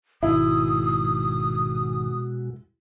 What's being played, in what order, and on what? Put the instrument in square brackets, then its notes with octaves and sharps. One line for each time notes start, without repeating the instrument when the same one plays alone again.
[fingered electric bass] G#1 [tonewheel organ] B2 G#3 F#4 [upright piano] E4 [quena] D#6